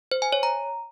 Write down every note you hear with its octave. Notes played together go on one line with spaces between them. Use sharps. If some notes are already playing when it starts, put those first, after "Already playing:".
C5
G#5
C#5
A#5